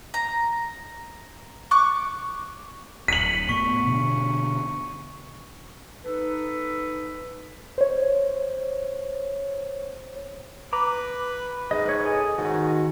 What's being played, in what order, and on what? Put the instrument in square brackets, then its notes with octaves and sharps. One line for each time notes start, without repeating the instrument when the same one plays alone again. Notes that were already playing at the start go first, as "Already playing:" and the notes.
[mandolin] A#5
C#6 D6 F#6
[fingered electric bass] D1 [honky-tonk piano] B6 F#7 [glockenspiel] C#7 D#7
[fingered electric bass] A2 B3 [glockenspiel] C#6
[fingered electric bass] B2 D3
[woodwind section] D#4 A4 B4
[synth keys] C5 C#5
[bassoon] B4 [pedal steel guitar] A#5 D6
[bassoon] G#2 [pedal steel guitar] D#5
[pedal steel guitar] B4 C#5
G#4 A4 G#5
[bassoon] G#2 [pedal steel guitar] D#3 F#4